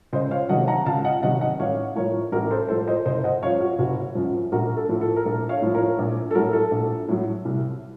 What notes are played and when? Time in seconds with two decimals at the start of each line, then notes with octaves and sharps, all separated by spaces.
0.13 C#2 C5 D#5
0.31 C#5 F5
0.49 C3 D#3 F#3 D#5 F#5
0.68 F#5 A#5
0.86 C#2 F5 A5
1.04 D#5 F#5
1.22 C3 D#3 F#3 D#5 F#5
1.41 D#5 F#5
1.59 A1 C#5 F5
1.95 A2 F3 A#4 C#5
2.32 A1 F#4 A#4
2.51 A4 C5
2.69 A2 F3 A4 C5
2.87 C5 D#5
3.06 F#1 C5 D#5
3.24 D#5 F#5
3.43 F#2 C#5 F5
3.47 F3
3.61 F#4
3.78 F#1 F#4
4.15 F#2 F3
4.52 A#1 F#4 A#4
4.77 A4
4.89 A2 F3
5.01 A4
5.16 A#4
5.26 A#1 A4
5.49 C#5 F5
5.62 A2 F3
5.74 A#4 C#5
5.98 A#1
6.31 A4
6.35 A2 F#3 F#4 A#4
6.53 A4
6.71 A#1
7.08 A2 F#3
7.45 C2